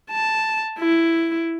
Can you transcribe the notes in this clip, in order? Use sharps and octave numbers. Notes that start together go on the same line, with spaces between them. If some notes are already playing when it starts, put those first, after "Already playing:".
A5
E4